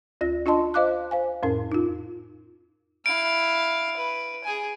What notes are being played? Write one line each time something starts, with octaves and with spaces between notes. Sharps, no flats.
D2 F4 A#6
D4 F4 D#5 A5 C6
C5 D#5 F5 D6 F#6
C5 F5 G#5
F2 A2 C#4 A#4
D#4 F4
E4 F5 D7
B4
G#4 G#5